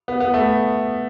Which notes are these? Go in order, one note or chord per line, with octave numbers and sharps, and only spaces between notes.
B3
B3
A3